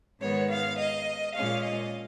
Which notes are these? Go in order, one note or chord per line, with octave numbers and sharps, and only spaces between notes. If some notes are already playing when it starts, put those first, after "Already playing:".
G#2 D#3 G#3 B3 C#5
F5
D#5
A#2 G#3 C#4 F5
D#5